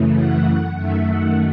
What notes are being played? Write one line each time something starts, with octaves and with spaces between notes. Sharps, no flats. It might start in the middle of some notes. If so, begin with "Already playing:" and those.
Already playing: F#2 C#3 E3 A3
F#5
F#2 D#3 A3 E5
F#5